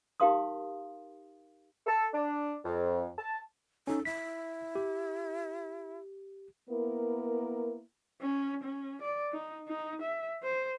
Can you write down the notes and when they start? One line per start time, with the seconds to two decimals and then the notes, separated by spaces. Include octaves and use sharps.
0.20 D#4 G4 A#4 F5 C6 D#6
1.86 A4
2.14 D4
2.65 F2
3.18 A5
3.87 C#4 D#4 A4
4.05 E4 B6
4.75 G4
6.70 A#3 B3 E4 A#4
8.22 C#4
8.63 C#4
9.02 D5
9.33 D#4
9.68 D#4
10.02 E5
10.43 C5